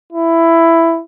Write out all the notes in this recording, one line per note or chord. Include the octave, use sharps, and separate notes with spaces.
E4